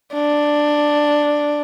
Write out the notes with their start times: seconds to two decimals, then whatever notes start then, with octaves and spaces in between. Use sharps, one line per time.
0.14 D4